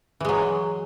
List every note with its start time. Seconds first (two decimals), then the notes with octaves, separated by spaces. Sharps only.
0.20 E3
0.25 G#3
0.29 F#3